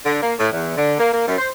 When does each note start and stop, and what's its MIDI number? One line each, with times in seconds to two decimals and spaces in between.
0.05 0.17 50
0.21 0.33 58
0.39 0.47 45
0.51 0.73 40
0.77 0.92 50
0.98 1.12 58
1.13 1.23 58
1.27 1.35 42
1.38 1.48 72